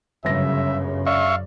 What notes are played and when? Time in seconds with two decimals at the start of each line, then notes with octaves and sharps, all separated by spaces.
0.25 G1 F#2 C#3 E5 A#6
1.07 D5 E5 F5 C#6